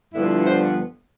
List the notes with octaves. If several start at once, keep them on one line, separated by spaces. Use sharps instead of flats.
G2 D3 F3 B3 E4
C5